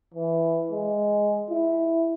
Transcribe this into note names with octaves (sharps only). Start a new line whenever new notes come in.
E3
G#3
E4